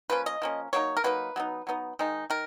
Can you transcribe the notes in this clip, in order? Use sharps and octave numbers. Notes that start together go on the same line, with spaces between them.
F3 A#3 C#4 B4
D#5
F3 A#3 C#4
F#3 A#3 D#4 C#5
A#4
F#3 A#3 D#4 B4
F#3 B3 D#4
F#3 B3 D#4
D#3 G#3 D#4
D#3 A#4